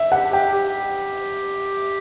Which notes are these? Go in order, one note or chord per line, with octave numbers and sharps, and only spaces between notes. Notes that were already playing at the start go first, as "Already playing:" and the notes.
Already playing: E5
G4 F#5
G4 G5
G4